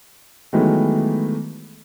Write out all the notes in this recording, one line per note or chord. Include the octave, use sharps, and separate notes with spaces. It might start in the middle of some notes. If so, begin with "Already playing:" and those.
D#3 E3 F#3 G#3 A3 B3